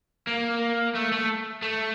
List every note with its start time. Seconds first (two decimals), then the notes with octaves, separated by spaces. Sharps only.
0.27 A#3
0.95 A3
1.12 A3
1.62 A3